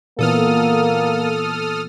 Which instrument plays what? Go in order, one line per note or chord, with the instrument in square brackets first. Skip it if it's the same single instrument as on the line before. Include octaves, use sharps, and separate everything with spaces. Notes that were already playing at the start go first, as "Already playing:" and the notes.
[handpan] A#2 E3 B3 [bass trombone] A#3 [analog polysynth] A4 D#6 F6